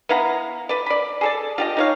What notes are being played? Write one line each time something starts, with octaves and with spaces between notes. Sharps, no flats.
B3 E4 F5 A#5
B4 D5
D5 B5
G#4 A4 D5
F4 G4 D#5
D#4 C#5 F5